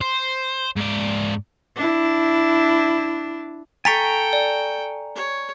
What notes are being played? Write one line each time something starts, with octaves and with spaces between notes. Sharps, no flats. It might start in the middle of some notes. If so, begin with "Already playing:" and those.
C5
G#2 D5
D4 E4
A4 G5 G#5 A#5 C#6 A6 B6 D7
D5
C#5